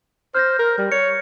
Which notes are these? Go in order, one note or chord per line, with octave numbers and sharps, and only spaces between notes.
C5 F6 G6 A#6
A#4
G3
C#5 C#7